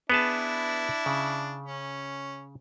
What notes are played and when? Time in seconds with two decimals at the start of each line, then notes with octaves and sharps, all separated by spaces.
0.10 B3 D4 E4 G#4 A5
1.06 C#3
1.66 C#4